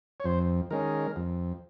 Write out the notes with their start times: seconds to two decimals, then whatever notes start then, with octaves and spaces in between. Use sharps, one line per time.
0.20 C#5
0.24 F2 C5
0.70 D#3 G#3 C#4 A#4
1.16 F2